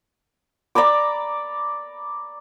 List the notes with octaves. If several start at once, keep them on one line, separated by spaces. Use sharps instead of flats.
D5 A#5 B5 D6